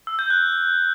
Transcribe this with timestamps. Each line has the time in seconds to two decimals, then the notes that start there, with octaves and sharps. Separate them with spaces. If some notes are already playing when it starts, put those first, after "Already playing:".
0.07 E6
0.19 G6
0.30 F#6